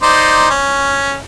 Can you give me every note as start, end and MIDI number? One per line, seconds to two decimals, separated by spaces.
0.02 0.49 63
0.02 0.49 72
0.02 0.49 74
0.51 1.18 61